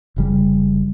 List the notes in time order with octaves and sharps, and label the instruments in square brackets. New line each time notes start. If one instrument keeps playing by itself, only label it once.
[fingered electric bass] F1 C#3 G3